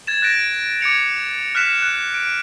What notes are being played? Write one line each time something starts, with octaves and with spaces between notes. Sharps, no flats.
G#6 A6 E7
F#6 A6 A#6 D7
D6 G#6 C#7 F7
F6 F#6 B6 E7
F#6
D7